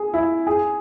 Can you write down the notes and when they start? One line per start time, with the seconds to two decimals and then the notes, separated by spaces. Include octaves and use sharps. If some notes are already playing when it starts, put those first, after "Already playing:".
Already playing: G#4
0.14 E4
0.47 G#4